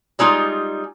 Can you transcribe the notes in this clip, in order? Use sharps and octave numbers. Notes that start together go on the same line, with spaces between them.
G3 G#3 D#4 F4